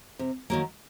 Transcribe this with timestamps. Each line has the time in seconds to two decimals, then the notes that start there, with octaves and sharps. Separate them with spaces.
0.19 C3
0.50 D#3 F#3 A#3